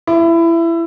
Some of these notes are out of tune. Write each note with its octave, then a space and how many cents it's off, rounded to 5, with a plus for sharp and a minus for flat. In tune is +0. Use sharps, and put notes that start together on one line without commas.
E4 +20